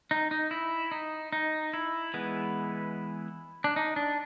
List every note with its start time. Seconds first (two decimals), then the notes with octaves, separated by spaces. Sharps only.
0.11 D#4
0.31 D#4
0.51 E4
0.91 D#4
1.33 D#4
1.73 E4
2.14 E3 G#3 B3
3.64 D4
3.76 D#4
3.96 D4